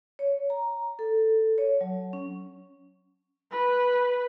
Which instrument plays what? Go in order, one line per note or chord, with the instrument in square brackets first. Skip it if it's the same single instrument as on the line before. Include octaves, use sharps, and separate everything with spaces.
[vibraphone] C#5
A#5
A4
C#5
F#3
C#4
[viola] B4